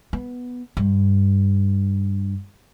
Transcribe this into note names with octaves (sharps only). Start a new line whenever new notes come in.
B3
G2